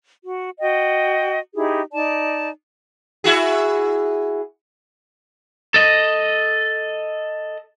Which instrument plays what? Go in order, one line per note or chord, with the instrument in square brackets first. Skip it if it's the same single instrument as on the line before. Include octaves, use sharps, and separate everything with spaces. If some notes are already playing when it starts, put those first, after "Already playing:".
[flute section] F#4
F#4 D#5 G5
D#4 E4 G4 G#4
D#4 D5 A5
[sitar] E4 F#4 G#4
[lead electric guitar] A4 D#5